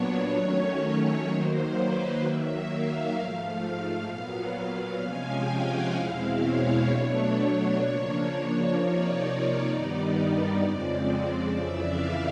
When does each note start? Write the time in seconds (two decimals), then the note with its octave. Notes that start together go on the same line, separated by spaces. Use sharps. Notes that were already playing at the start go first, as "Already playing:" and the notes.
Already playing: A#2 F#3 B3 D4 C#5
0.34 D#3 F#3 A3 C#4
1.27 D#3 F#3 A#3 C5
1.74 B4
2.21 D#3 F#3 A#3 E5
2.68 F5
3.14 G#2 F3 A3
4.08 A#2 F#3 B3
5.01 C3 F3 G#3 C#4 G#5
5.32 G5
5.63 F#5
5.94 E2 B2 G#3 C4 E4 F5
6.41 C#5
6.88 B2 F#3 A3 D4
7.81 C#3 F3 A#3 D4
8.75 C3 F3 A#3 D#4 D5
9.68 G2 D#3 G3 B3 D#4
10.62 F2 C#3 F3 G#3 C4
11.55 F2 C#3 E3 E5
11.86 F5